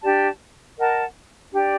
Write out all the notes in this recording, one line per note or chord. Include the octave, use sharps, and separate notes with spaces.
D4 G4 D5 A5
A#4 D#5 F#5 A5
D4 G4 D5